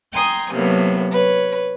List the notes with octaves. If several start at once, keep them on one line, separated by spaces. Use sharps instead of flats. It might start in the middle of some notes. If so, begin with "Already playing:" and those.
G5 G#5 A#5 C6 D#6
A2 C3 F#3 A#3 B3
B4 C#5